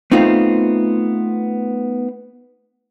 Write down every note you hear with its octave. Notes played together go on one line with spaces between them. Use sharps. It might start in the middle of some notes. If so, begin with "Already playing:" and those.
A3 B3 C4 D#4 F4